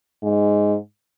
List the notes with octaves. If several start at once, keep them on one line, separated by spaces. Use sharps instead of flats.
G#2